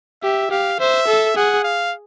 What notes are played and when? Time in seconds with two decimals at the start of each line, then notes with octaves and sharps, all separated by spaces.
0.23 G4 E5
0.50 G4 F5
0.80 C5 E5
1.07 A4
1.36 G#4 F#5
1.64 F5